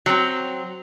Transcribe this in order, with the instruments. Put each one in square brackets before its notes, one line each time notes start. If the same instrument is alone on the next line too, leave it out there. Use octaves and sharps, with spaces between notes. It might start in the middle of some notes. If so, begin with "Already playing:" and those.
[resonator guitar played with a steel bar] F#3 C4